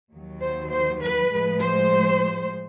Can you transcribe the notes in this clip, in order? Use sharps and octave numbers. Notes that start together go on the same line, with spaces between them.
D#2 D#3 F#3
C5
C5
B4
A2 F3 G#3
C5